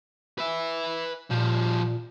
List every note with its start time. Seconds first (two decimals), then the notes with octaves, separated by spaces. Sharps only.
0.38 B4 E5
1.30 A#2 F3 G3